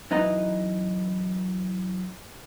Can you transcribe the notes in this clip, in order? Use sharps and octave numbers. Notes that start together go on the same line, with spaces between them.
F#2 E3 D#4 B4 D#5 A#5